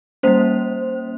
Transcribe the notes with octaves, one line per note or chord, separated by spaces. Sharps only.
G3 A#3 C#4 C5